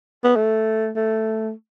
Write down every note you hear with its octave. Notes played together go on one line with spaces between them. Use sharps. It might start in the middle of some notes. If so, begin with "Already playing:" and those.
B3
A3
A3